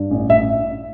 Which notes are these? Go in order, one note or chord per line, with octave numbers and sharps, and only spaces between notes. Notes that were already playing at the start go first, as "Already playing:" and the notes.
Already playing: G2
A1
A1 E5